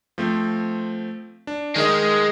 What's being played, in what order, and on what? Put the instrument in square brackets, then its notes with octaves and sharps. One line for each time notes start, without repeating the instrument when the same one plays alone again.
[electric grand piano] F3 A3 C4
D4
[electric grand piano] D#3 A#4 D#5 [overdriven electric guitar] G#3